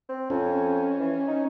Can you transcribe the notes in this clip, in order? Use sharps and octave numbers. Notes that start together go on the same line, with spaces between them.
C4
F2 C#4
E3
D#4